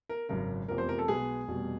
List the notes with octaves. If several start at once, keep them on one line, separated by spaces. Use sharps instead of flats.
A#4
G#1 F#2 C#3 A#4
F1 E2 C3 F3 A#4
C5
A#4
A4
B1 B2 G#3 B3 G#4
F1 E2 B2 G3